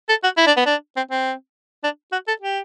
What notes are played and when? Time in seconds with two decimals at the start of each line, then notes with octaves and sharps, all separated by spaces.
0.09 A4
0.24 F#4
0.37 E4
0.47 D4
0.57 B3
0.66 D4
0.97 C4
1.11 C4
1.84 D4
2.12 F#4
2.28 A4
2.42 G4